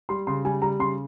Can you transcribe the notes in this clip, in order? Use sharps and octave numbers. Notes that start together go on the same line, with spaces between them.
G3 C6
C#3 C6
G3 G#5
G3 A#5
C#3 C6